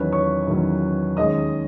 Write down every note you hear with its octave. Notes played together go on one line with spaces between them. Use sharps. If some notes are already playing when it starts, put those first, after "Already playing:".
Already playing: E2 D#3 F#3 C#4 B4
C#5 C#6
E2 D#3 F#3 C#4
D#2 D#3 G#3 C#4 D#5 D#6